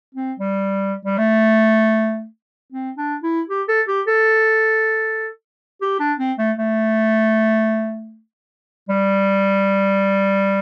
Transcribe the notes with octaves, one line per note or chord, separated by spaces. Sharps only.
C4
G3
G3
A3
C4
D4
E4
G4
A4
G4
A4
G4
D4
C4
A3
A3
G3